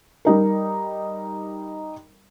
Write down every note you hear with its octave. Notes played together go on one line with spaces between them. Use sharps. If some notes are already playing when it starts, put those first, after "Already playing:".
G3 D#4 A#4